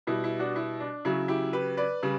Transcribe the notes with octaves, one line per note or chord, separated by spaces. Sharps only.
B2 G3 E4
E4
D4 F#4
E4
D4
C#3 F#3 E4
E4 G4
G4 B4
B4 D5
C#3 G3